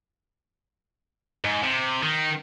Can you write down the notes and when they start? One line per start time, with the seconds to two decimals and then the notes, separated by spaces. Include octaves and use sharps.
1.45 G#2
1.64 C3
2.03 D#3